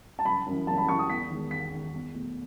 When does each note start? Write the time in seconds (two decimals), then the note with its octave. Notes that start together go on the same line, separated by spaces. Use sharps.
0.19 A5
0.25 F#1 B5
0.46 F#2 E3
0.67 F#1 A5
0.78 B5
0.88 F#2 E3 C#6
0.99 D#6
1.09 E2 B6
1.30 D#3 G#3
1.51 E2 B6
1.72 D#3 G#3
1.93 E2
2.14 B2 A3